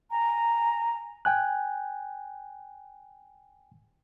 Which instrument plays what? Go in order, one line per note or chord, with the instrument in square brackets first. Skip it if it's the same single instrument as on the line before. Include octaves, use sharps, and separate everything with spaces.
[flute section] G#5 A#5
[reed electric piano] G5 G#5 F#6